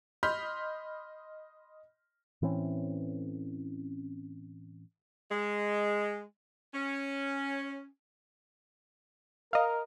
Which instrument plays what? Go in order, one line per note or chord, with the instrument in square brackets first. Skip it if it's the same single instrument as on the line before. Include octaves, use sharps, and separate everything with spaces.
[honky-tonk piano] D#5 B5 C6 F6 G6 B6
[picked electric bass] A2 E3 C4 C#4
[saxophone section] G#3
C#4
[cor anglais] A#4 [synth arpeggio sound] D#5 F5